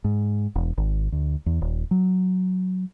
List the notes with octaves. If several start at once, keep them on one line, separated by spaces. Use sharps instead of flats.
G#2
E1
G#1
D2
E2
D#1
F#3